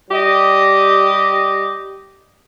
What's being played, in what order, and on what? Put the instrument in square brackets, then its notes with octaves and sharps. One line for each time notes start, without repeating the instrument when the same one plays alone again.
[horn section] G3 G4 D#5